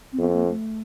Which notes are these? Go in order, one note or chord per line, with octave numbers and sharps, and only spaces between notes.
C4
F2 B3
A#3
A3